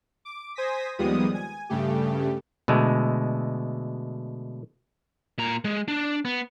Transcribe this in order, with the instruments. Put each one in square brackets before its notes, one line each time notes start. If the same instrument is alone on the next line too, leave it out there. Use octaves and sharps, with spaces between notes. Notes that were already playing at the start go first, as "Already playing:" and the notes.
[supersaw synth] D6
C5 G#5 D#6 A#6 B6
D#2 F3 G3 G#3 B3 D#6
G#5
G2 C#3 A3 G4
[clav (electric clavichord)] B2 D3 G#3 A3
[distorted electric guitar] A#2 A#5
G#3
D4
B3